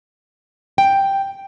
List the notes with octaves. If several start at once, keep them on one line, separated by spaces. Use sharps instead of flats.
G5